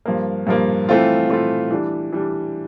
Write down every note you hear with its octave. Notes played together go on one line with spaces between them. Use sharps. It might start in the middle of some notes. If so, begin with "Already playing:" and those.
G2 F3 A#3
G2 F3 A#3
E3 A3 C4 F4
E3 A3 C4 F4
E3 G3 D4
E3 G3 D4